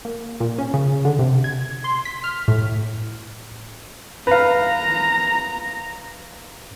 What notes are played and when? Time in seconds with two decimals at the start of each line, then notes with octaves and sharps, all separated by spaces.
0.05 A#3
0.40 A#2
0.58 C#4
0.74 C#3
1.05 D3
1.19 C3
1.44 G#6
1.84 C6
2.05 B6
2.24 F6
2.48 A2
4.27 B4 F5 A#5